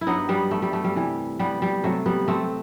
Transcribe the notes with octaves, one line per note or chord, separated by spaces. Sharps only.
E4
G2 F#3 B3 D#4
G3 B3
A3
G3
A3
G3
C3 E3 G3
G3 B3
G3
C3 F#3 A3
G3 B3
A3 C4